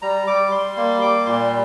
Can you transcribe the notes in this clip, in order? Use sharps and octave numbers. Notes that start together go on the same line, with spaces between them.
G3 A#5
G3 D6
G3 C6
A#3 C6
G3 D6
A#2 C6